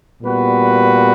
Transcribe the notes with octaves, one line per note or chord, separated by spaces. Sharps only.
A#2 G3 B3 F#4 B4